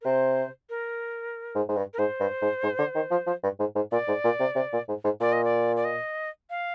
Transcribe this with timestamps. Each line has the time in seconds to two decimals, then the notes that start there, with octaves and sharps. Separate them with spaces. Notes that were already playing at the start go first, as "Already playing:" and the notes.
0.01 A#4
0.05 C3 C5
0.70 A#4
1.55 G#2
1.69 G#2
1.77 G2
1.93 A#4
1.99 G#2 C5
2.20 G2
2.42 G#2
2.63 G#2
2.79 D3
2.96 D#3
3.12 F3
3.27 F3
3.44 G2
3.60 G#2
3.76 G#2
3.92 A#2 D5
4.08 G#2
4.25 A#2
4.40 C3
4.56 C3
4.73 A#2
4.89 G#2
5.04 G#2
5.21 A#2 D5
5.33 D#5
5.44 D5
5.76 D5
5.85 D#5
6.50 F5